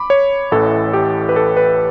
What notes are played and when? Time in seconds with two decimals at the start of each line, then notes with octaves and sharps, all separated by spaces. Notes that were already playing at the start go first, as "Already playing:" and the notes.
Already playing: B5 D6
0.10 C#5
0.51 A1 A2 E3 A4
0.93 G4
1.29 B4
1.36 A4
1.57 B4